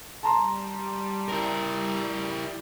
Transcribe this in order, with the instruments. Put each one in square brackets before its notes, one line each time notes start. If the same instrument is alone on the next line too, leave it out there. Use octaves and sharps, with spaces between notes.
[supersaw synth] G3 [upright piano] A5 A#5 C6
[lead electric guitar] E4 A#4